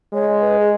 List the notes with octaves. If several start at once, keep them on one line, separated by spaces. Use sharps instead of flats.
G#3 C#5
B4
G#4